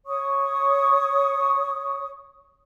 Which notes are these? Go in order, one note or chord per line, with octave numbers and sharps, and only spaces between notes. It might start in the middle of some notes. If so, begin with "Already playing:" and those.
C#5 C#6 D#6